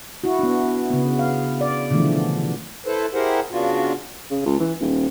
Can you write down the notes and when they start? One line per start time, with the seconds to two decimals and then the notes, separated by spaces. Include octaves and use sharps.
0.24 E4 F#4
0.39 B3 D4
0.90 C#3 B3
1.19 F5
1.61 D5
1.90 B2 D3 E3 F3 A3
2.86 E4 A4 B4 C5
3.14 E4 G4 G#4 A#4 C5 F#5
3.52 C#3 B3 D4 F4 F#4
4.31 C#3
4.46 C#2
4.60 E3
4.80 D#1